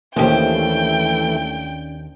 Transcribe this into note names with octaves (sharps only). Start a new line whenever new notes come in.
D#2 E3 A3 C#4 D4 G4 C5 G5